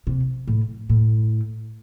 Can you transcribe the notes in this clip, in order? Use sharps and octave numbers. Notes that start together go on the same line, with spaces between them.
C3
A2
A2